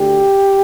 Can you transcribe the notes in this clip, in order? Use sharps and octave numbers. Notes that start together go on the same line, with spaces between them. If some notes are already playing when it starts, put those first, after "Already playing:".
Already playing: D2 G4